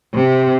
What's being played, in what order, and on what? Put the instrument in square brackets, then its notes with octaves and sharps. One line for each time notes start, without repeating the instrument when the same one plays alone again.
[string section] C3